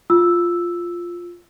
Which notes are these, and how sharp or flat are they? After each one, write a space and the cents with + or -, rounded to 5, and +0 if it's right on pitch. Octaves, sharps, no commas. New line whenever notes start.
F4 +0 E6 +0